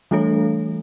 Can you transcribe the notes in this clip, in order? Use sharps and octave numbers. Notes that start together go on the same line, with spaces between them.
E3 G3 A3 D4 A4 C#5